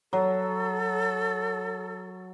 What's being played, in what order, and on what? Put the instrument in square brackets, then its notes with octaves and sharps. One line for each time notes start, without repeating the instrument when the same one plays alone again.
[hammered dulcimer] F#3 [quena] A4